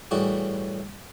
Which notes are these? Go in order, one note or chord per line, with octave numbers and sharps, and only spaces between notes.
A2 E3 G3 F#4 G#4